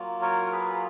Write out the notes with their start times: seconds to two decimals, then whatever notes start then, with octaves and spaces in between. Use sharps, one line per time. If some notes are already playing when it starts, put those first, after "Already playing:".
Already playing: F#3 A#3 F4
0.22 A#4 C#5
0.47 A#4
0.52 G#4 B4